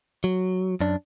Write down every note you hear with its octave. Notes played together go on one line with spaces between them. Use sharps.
F#3
F#2 D4